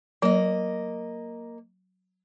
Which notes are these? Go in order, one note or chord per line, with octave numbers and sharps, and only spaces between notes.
F#3 A#3 D#5